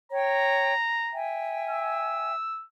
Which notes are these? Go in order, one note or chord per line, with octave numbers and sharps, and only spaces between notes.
C#5 G5 A#5
E5 G5 G#5
E6